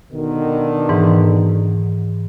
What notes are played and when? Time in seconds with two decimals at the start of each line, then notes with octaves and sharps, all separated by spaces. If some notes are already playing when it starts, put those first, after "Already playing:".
0.13 B2 D3 D#3
0.89 G#2 E3